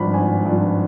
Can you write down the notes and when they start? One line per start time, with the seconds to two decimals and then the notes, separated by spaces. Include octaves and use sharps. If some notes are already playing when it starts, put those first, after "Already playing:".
Already playing: G#1 G2 F3 B5
0.13 G#1 G#5
0.45 G2 F3